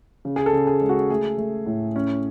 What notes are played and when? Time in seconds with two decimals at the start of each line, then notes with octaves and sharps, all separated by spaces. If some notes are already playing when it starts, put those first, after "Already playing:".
0.25 C#3
0.36 G#4
0.46 A4
0.53 C#3
0.67 G#4
0.81 G#3
0.89 F#4
1.10 A3 G#4
1.38 A3
1.66 A2
1.96 C#4